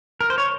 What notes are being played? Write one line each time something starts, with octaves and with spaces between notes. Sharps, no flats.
A#4
C5
C#5